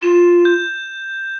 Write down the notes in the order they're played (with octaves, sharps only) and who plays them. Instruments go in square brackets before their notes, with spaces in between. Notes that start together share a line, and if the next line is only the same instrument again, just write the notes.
[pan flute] F4 [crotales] E7
[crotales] G6